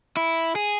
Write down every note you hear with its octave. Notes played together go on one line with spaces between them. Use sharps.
E4
G#4